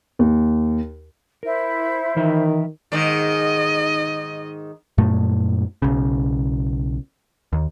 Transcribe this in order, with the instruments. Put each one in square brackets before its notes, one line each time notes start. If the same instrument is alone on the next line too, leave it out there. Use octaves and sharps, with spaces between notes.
[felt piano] D#2
[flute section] E4 C5 [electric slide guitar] A#4
[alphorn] D#3 [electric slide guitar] E3 A#4 E5
[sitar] G#2 D#3 [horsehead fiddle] D#5
[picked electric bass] F#2 A#2 A3
B1 C#3
D#2